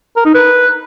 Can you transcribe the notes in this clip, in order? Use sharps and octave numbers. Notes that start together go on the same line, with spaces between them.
A#4
D#4
B4